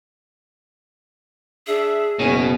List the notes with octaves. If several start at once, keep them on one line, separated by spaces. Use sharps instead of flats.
D4 G#4 E5
F#1 B2 C#4